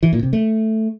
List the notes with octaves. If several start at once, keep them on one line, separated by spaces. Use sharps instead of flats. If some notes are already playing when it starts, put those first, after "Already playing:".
E3
A#2
C3
A3